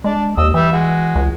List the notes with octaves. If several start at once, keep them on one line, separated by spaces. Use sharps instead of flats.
G#3 D4 D5
D#2 D#5 D#6 E6
E3 G3 G4 E5
G#3 F#4
C#2